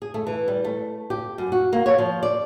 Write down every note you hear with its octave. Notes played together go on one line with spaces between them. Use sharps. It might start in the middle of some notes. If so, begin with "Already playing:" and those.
G#4
A3
E3
G3
A3
G4
F#2
F#4
A#3
C#5
F3
D5